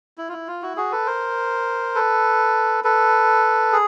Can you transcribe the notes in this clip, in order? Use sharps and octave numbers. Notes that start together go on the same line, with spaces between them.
E4
F4
E4
F4
E4 F#4
F#4 G#4
A4 B4
A#4 C5
A4 B4
A4 B4
G#4